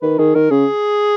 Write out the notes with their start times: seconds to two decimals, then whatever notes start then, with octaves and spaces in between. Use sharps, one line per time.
0.02 D#3 B4
0.19 D#3 G#4
0.35 D#3 A#4
0.51 C#3 G#4